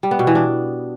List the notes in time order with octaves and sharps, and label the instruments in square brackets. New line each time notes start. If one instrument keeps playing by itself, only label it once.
[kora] G3
B3
B2
E3
D4